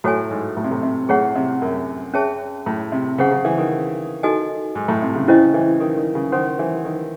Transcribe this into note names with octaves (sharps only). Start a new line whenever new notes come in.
A2 F#4 A4 C#5 G#5
G#2
A2
C3
A2
C3
A2 G#4 C#5 F#5
C3
F#2
C#4 G#4 C#5 E5 A5
A2
C3
C#3 G#4 C5 F#5
C#3
E3
D#3
D#4 F#4 A4 D#5 G#5
G#2
A2
C3
C#3
C#3 C#4 E4 C5 D#5
E3
D#3
D#3
C#3
D#3 C5 F#5 C6
E3
D#3